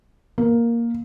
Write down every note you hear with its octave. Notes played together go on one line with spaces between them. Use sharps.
A#3